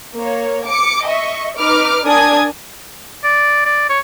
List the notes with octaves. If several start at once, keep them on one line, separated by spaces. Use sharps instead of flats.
A#3 C#5
D6 C#7
D#5 E5 C#6
D#4 B4 D6 F6
D4 A#4 D5 G#5 D#6 G#6
D5
D5
C#5